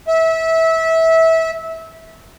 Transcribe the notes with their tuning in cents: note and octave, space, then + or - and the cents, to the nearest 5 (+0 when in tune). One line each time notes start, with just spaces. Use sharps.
E5 -20